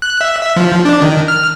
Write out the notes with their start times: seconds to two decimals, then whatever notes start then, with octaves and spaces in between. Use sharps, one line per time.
0.02 F#6
0.21 E5
0.42 E5
0.56 F3
0.85 D4
1.02 D#3
1.28 F6